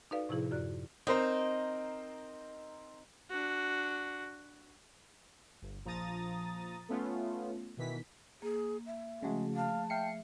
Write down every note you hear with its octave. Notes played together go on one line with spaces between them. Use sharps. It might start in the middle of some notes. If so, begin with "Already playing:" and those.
D#4 F#4 A4 B4 D5 F5
A2 C3 F3 E4 G#4
F#2 F4 F#4 D5 F#6
C4 D#4 A#4 C5
D4 F#4
G1
A#1 F3 A#5 D#6 A6
A3 B3 C#4 F4
B2 D#3 E3 B6
A#3 G#4
E5
C#3 F3 G#3 A3 F#4 G#4
F5 A5
E5 F5 G5 C7 C#7